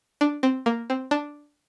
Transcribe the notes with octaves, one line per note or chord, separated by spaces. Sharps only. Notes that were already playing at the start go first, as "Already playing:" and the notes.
D4
C4
A#3
C4
D4